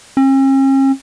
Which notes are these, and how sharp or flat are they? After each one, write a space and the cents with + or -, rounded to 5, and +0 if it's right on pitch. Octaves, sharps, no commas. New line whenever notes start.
C#4 -45